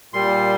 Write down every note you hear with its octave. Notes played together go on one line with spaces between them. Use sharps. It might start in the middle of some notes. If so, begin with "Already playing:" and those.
A#2 G3 C6